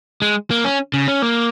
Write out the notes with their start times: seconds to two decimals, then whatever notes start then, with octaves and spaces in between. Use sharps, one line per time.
0.22 G#3
0.51 A#3
0.65 C#4
0.94 C#3
1.08 C#4
1.22 A#3